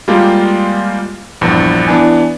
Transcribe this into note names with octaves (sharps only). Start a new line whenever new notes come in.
G3 G#3 A#3 F4 G4
A#1 E2 G2
E3 B3 D4 G#5